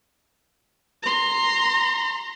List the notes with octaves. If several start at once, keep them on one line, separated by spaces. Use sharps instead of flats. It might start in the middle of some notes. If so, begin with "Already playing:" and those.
A#5 C6